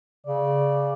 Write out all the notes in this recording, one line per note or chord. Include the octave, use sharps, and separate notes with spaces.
C#3 D5